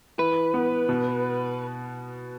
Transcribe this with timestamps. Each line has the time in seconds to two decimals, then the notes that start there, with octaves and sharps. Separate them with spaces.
0.18 E3 B4
0.54 B3
0.89 B2